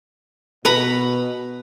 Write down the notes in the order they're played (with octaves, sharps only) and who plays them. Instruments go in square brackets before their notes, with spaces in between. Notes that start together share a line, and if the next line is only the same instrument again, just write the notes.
[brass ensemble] B2 [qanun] B4 A#5 B5